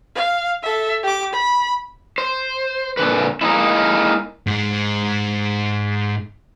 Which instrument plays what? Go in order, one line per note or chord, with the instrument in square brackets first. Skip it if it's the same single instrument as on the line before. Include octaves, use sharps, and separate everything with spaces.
[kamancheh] F5
A4 E5
G4 D6
B5
[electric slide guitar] C5
A#2 D3 D#3 B4
G#3 A#3 C4 D#4 E4
[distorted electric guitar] G#2 G#3